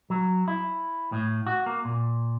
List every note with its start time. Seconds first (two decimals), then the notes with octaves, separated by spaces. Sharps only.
0.10 F#3
0.48 E4
1.12 A2
1.47 F#4
1.66 A#3
1.85 A#2